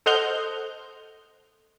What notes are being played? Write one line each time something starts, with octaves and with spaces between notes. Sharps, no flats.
A4 C5 D#5 F#5 F6 G6